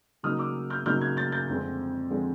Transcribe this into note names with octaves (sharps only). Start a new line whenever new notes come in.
C#3 F#3 A#3 D#4 D#6 F6
D6 E6
F6 G6
C#3 F#3 A#3 D#4 F6 G6
F#6 G#6
G6 A6
G6 A6
F2 D3 F3 G#3 C4
D3 F3 G#3 C4